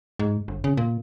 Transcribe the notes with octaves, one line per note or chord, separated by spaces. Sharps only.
G#2
G1
C#3
A#2